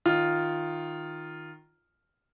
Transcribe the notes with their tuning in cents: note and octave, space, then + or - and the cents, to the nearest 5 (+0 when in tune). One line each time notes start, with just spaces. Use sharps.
D#3 -5 F4 +0